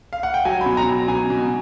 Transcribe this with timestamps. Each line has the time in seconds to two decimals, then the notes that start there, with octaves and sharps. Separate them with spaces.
0.13 F5
0.23 F#5
0.34 G5
0.45 F#3 G#5
0.61 B5
0.66 B2
0.77 A#5
0.88 F#3
1.08 B2 G#5
1.30 B2